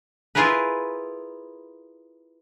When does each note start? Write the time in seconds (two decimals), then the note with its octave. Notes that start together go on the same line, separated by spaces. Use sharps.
0.35 E4 F4 G#4 A#4 B4